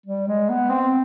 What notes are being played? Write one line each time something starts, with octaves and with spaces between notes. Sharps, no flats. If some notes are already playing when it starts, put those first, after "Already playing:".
G3
G#3
B3
C4